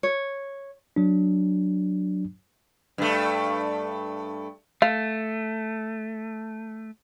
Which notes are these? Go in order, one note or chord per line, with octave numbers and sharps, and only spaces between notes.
C#5
F#3 D4
G2 A3
A3 F5